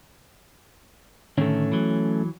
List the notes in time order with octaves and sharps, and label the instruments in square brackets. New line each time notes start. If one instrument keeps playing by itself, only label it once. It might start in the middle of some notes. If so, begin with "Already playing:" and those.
[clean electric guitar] A2 D3 D#3 [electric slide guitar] A3 C#4
[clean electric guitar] E3 F#3